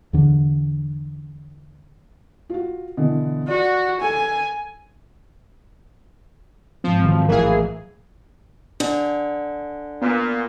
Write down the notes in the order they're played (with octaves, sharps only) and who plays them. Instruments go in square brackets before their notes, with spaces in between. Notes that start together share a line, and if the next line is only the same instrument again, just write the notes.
[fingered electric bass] E2 D3
[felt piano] F4 F#4
B2 D3 E3
[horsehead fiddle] F#4 [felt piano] D5
[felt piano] A4 [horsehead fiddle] G#5
[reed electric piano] G#2 C4 [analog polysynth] F3
[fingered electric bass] D#3 F#3
[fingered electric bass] A#1 A2 F#3 [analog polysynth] E3 G#4 [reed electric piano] A#4 F5
[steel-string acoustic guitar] D3 [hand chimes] D4
[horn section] A#2 [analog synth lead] B3